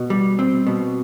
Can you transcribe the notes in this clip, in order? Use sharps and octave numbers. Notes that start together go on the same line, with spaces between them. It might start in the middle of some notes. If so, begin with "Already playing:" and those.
Already playing: B2
G3
C4
B2